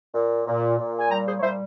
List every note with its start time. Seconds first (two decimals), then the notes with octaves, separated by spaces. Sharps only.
0.14 A#2
0.46 A#2
0.79 A#2
0.98 G#5
1.10 G3 G5 A#5
1.26 G#4 C5
1.38 C#5
1.42 G3 C5 E5